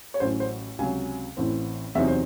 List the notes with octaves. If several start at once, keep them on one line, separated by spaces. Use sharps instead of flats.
C#5
A1 A2 F#3 C#4 C5
C5
C#2 C3 F#3 G#5
A1 A2 E3 C4
E2 C3 F#3 C4 D#4 E5
C5